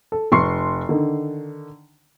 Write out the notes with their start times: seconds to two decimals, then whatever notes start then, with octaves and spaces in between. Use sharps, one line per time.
0.12 A4
0.32 F1 C6 C#6 C7
0.89 D3 D#3